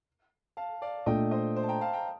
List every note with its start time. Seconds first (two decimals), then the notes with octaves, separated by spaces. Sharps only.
0.57 F5 A5
0.82 D5 F5
1.06 A#2 A3 D4 D#5 G5
1.31 C5 D#5
1.56 C5
1.63 A5
1.69 G5 A#5
1.81 F5 A5
1.93 G5 A#5